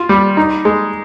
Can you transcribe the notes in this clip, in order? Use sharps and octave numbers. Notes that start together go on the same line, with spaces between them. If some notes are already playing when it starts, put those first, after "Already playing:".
Already playing: F4
G3
D#4
G#3